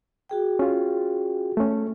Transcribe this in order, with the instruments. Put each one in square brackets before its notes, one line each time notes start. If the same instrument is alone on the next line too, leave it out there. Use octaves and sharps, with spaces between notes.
[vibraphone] F#4 G#4 G5
[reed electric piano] C#4 F4
A3 C#4